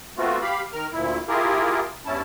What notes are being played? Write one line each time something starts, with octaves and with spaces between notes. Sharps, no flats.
A3 B3 C4 F4 F#4
G4 F5 B5
D#3 A#4 F6
D2 A#2 E4
E4 F4 G4 G#4 A#4
E2 G2 C#4 E4 A5